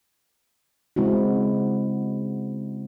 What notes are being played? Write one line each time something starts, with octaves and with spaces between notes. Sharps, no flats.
C#3 G#3 C4 E4 F#4